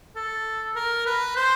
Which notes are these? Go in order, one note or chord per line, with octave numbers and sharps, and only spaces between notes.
A4
A#4
B4
C5